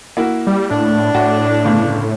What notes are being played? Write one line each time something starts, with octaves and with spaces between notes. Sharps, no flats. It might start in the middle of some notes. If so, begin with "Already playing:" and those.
A#3 E4 F#4
G3
A2 D4
A2 F#4
G1 C#3